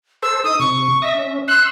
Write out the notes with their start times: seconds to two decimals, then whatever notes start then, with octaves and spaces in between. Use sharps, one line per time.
0.22 A4 C5 E6
0.44 D#4 D#6
0.60 C3 C#6
1.02 D#5 E5 A#6
1.15 C#4
1.48 C6 E6 F#6